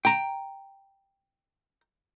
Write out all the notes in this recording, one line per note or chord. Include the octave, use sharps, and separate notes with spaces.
G5 A#5